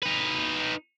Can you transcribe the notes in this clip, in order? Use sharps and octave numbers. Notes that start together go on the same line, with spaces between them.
D#4 B4